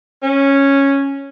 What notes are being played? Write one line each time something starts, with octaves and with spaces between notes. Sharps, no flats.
C#4